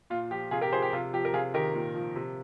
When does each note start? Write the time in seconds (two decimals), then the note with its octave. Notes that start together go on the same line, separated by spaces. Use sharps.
0.10 A#2 F4
0.31 F3 G4
0.51 C3 F4 G#4
0.61 G4 A#4
0.72 F3 G#4 C5
0.82 G4
0.93 C3 F4
1.13 F3 G4
1.25 A#4
1.33 C3 F4 G#4
1.54 D#3 G4 A#4
1.75 A#2
1.95 F3
2.16 C3